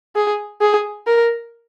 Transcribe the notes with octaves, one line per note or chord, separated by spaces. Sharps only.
G#4
G#4
A#4